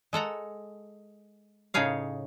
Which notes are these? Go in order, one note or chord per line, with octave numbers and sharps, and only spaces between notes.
G#3 A4 F#5 A#5
A2 C#3 D#4 G#4 C#5 F5